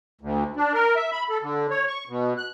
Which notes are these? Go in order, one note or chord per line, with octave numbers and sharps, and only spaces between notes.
D2
D4
A#4
E5
B5
A4
D3
C#5
C#6
B2
F#6